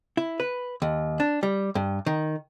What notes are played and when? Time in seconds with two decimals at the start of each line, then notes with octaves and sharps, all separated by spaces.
0.17 E4
0.40 B4
0.82 D#2
1.20 D4
1.43 G3
1.75 G2
2.06 D#3